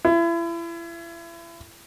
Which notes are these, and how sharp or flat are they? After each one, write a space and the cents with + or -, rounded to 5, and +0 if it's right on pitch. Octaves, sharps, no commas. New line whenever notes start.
E4 +35